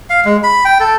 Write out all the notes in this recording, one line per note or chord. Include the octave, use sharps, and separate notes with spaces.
F5
G#3
B5
G5
A4